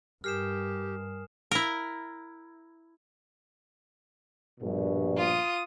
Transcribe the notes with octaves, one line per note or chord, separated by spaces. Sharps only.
G2 G4 A#4 G#5 D#6 F6 C7 E7
E4 A#4
A#1 G2 B2
F4 D#6